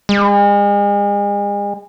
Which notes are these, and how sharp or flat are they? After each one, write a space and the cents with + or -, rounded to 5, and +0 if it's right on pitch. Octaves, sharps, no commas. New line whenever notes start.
G#3 -40